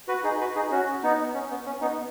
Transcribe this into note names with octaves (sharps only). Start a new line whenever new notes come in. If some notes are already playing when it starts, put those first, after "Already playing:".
F#4 B4
D#4 G#4
F#4 B4
D#4 G#4
C#4 F#4
B3 D#4
C#4
B3
C#4
B3 D#4